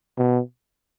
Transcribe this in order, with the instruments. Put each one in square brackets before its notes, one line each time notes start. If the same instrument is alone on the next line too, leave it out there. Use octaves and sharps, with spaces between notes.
[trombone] B2